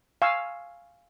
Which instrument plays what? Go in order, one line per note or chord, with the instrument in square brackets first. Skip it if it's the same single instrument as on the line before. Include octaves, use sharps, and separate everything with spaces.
[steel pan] F5 G#5 C#6 E6